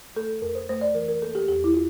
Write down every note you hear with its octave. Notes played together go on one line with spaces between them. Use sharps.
A3 A4
F2 A#4
C5
A3 C5
D5
E3 A#4
A#4
A#3 A4
G4
E2 G4
E4
F4